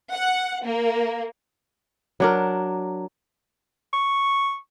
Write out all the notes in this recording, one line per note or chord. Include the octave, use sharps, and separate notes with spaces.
F#5
A#3
F#3 D4 A#4
C#6